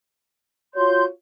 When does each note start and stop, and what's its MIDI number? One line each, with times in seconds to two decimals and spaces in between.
0.75 1.05 65
0.75 1.05 66
0.75 1.05 73
0.75 1.05 84
0.75 1.05 91